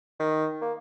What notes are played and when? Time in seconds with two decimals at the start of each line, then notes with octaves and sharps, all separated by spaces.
0.20 D#3
0.62 A#3